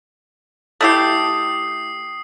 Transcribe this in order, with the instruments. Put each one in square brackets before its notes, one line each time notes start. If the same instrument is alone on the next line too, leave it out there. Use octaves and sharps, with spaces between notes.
[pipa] A3 E4 G4 [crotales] D#6 C7